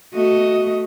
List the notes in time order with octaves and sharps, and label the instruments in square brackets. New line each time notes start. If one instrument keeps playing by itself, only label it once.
[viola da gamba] A3 F#4 D#5